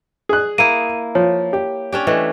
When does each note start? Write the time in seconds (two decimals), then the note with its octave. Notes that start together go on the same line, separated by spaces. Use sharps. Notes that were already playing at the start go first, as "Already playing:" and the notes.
0.29 G#4 F#6
0.58 A#3 E4 D#7
1.15 F3 C#5
1.53 G4
1.92 C#4 D4 G4
2.07 E3 A3 D#5